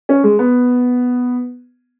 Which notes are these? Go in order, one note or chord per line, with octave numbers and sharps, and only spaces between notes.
C#4
G#3
B3